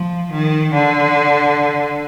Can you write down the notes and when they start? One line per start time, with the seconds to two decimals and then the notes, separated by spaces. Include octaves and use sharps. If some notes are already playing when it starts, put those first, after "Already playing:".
Already playing: F3
0.32 D#3
0.73 D3